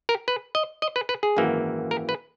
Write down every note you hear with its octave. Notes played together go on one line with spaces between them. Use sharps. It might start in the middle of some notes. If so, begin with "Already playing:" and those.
A#4
B4
D#5
D#5
B4
B4
G#4
G#1 F#2 E3 A#3
A#4
B4